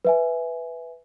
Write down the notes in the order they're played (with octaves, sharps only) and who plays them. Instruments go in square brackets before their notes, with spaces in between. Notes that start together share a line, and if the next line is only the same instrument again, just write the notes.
[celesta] B4 E5 G#5